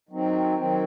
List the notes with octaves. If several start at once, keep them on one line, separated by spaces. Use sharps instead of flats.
D#3 F#3 C4
D#3 F#3 C4